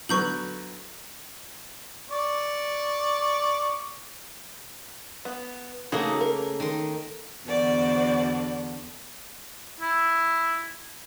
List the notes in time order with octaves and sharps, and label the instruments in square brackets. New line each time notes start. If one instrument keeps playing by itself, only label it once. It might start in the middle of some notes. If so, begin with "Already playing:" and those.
[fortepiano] D3 F#3 B3 [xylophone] C#6 G6 F#7
[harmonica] D5 C#6
[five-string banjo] B3
[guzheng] C#3 A3 A#3 [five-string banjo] D#4 F#4 G#4
[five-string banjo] A#4
[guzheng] D#3 C6
[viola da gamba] E2 D3 [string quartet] F#4 C5 D5
[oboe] E4